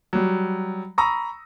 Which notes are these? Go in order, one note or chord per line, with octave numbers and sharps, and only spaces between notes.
F#3 G3
A#5 B5 C#6 D#6 E6 A#6